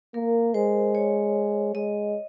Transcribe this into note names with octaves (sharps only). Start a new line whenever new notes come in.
A#3 A#4
G#3 C5
C#5
G#3 D#5